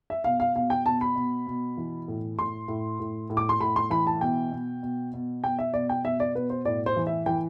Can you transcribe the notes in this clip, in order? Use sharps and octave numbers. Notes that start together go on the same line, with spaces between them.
E5
B2 F5
F5
B2 F5
G5
B2 A5
B5
B2
B2
E3
A2
A2 C6
A2
A2
A2
D6
C6
A2 B5
C6
E3 B5
A5
B2 G5
B2
B2
B2
B2 G5
E5
B2 D5
G5
B2 E5
D5
B2 B4
C5
A2 D5
C5
E3
E5
E3 G5